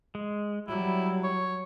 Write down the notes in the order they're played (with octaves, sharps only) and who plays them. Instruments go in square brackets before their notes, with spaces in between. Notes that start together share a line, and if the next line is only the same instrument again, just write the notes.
[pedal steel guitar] G#3
[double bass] F#3 [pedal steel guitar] G3 [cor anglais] E4
[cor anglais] C#5